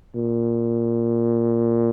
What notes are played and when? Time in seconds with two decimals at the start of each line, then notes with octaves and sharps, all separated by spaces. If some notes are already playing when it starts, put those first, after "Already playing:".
0.15 A#2